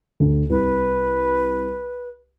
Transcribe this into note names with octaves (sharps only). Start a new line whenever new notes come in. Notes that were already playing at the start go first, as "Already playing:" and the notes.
D2 D3
C2 B4